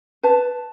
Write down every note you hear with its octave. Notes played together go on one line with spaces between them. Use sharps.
B4 A5